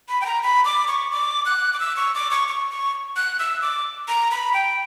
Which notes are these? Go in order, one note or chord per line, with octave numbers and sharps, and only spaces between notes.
B5
G5
A#5
B5
D6
C#6
D6
F#6
D6
E6
C#6
D6
C#6
C#6
C#6
F#6
E6
D6
A#5
B5
G5